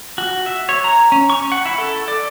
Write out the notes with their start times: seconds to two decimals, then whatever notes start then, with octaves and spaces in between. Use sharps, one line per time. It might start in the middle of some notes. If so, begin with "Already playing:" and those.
0.18 F#4
0.46 E5
0.69 C#5
0.84 A#5
1.12 C#4
1.30 C#6
1.52 F#5
1.65 E4
1.78 A4
2.08 D5